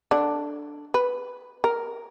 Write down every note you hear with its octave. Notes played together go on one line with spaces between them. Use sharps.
D3 D4
B4
A#4